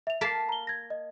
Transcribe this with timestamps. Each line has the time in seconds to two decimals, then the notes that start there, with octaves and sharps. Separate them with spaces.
0.07 E5 F7
0.21 A#3 A#4 A5 B6 C7
0.49 A#5 G7
0.67 G#6 A#6
0.90 D#5